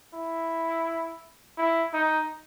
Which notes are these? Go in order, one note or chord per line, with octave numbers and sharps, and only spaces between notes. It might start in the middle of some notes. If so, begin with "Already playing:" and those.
E4
E4
D#4